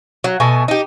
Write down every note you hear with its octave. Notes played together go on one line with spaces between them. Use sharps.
F#3
B2 A3 G#5
D#4 G4